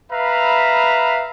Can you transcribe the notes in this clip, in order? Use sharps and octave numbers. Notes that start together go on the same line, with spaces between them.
B4 E5 F5 A#5 B5